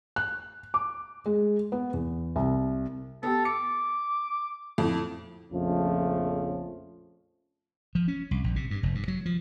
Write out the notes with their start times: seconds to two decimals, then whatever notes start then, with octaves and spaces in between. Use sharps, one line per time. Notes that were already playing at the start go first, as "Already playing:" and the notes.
0.16 F#6
0.74 D6
1.26 G#3
1.72 B3
1.93 E2
2.36 C2
3.23 B3 G4 A4
3.45 D6 C#7
4.78 F2 A2
5.52 A#1 F2 C#3 F3 A3 C#4
7.95 F3
8.08 C#4
8.31 C2
8.44 A#1
8.56 C3
8.71 G2
8.83 F1
8.95 G2
9.08 F#3
9.26 F3